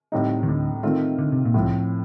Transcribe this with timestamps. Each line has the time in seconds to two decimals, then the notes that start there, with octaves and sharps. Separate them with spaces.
0.12 A2 G3 C4 D#4
0.43 D#3
0.48 D2 D3
0.83 D#3 A3 C4 F4
1.19 D3
1.32 C3
1.45 A#2
1.54 C2 A2 C3 F3 C4